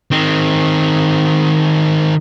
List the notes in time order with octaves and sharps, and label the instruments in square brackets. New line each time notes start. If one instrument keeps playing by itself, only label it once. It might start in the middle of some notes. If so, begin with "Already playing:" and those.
[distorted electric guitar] D#3 C4